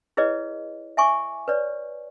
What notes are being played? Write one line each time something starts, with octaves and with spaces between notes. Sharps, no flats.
E4 G#4 B4 C#5 D#5
E5 G#5 C#6 D6
B4 C#5 D5